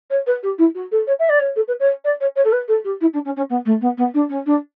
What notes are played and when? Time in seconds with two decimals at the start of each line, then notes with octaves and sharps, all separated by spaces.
0.10 C#5
0.27 B4
0.43 G4
0.58 E4
0.75 F#4
0.91 A4
1.07 C#5
1.19 E5
1.29 D5
1.39 C#5
1.56 A4
1.68 B4
1.80 C#5
2.04 D5
2.20 C#5
2.36 C#5
2.44 A4
2.52 B4
2.68 A4
2.84 G4
3.01 E4
3.13 D4
3.25 C#4
3.36 C#4
3.49 B3
3.65 A3
3.81 B3
3.97 B3
4.14 D4
4.29 C#4
4.46 D4